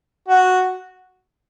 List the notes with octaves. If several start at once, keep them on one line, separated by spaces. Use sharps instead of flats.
F#4